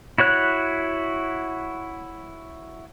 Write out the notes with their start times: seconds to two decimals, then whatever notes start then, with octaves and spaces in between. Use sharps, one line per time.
0.18 E4 F#4 C#5 F#6